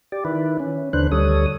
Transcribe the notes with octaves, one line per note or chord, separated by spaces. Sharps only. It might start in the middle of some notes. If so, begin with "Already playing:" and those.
G4 D5
D#3 E4 B4
C#4
D#2 D3 D4 B4 C5 F#6
D2 G3 A4 C#5 D#6